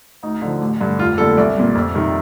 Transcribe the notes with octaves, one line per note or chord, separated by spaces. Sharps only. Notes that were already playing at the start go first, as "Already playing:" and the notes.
D2 D#4
D3 F3
A1
G2 D3
F1 F4
D#2 D3 G3 A4
C2 D5
A#2 G3
F2
C3 D#3 G3